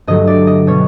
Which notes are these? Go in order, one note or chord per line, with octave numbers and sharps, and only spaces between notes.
G2 D3 F#3 A3 D#5
D5
D#5
B2 G3 B3 C#5